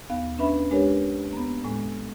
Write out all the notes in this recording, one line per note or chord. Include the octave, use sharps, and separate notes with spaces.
D#2 B3 F5
C#4 D4 B4 E5 B5
G#3 D4 G4 A#4 B4 C#5
A#3 B3
A2 G#3